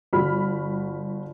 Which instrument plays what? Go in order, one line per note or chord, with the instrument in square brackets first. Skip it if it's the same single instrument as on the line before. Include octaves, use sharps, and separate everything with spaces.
[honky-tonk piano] G1 F#4 B5 F6